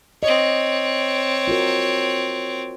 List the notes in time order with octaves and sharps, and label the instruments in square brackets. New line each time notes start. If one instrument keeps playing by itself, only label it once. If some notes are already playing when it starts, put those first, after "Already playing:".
[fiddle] C4 C#5 [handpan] D#5
[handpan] F4 F#4 A#4